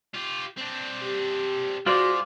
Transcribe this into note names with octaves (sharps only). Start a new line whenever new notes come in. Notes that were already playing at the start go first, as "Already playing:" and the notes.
F4 G4
C4 D4
G4
G#2 G#3 F4 F#4 C5 D5